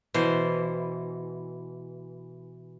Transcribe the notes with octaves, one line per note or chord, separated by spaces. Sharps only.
B2 E3 C5